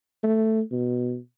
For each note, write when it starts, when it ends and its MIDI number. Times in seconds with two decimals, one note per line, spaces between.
0.23 0.61 57
0.72 1.17 47